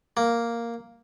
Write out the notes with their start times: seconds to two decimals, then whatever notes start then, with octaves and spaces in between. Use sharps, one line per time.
0.17 A#3